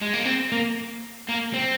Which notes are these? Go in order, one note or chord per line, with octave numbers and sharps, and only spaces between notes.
G#3
A#3
C4
A#3
A#3
C4